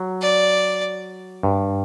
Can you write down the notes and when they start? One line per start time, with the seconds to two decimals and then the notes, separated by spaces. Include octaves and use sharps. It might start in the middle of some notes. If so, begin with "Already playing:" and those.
Already playing: F#3
0.22 D5
1.43 G2